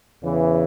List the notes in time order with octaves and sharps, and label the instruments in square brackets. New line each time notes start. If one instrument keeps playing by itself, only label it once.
[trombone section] E2 C#3 E3